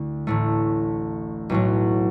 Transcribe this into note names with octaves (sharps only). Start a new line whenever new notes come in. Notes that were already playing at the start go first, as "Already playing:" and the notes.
Already playing: D2 D3 E4
A1 A2 A3
B1 A2 F#3